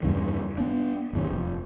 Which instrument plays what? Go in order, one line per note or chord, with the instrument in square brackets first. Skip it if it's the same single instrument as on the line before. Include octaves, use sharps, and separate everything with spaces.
[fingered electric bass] E2 G2 C#3 E3
B3 D4
G1 E2 C3
F1